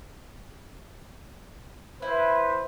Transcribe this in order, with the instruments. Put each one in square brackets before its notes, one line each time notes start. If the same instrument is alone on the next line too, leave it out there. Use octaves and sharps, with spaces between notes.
[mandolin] E4 [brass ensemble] B4 C5